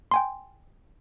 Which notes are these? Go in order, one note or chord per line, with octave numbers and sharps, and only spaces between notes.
G5 G#5 C6